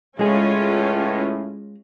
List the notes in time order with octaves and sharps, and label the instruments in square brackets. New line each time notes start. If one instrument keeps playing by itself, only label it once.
[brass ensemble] C#2 A2 [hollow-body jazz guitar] G#3 G#4 [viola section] C#4 F4